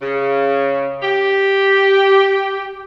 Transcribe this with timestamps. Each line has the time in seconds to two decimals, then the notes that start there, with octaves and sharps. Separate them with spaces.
0.01 C#3
1.03 G4